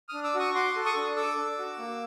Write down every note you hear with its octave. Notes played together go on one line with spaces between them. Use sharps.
D4 D#6 F6
D6 E6
F#4 C#6 D#6
F#4 C6 D6
A4
C#6 D#6
D4
A4 D6 E6
D4
F#4
A#3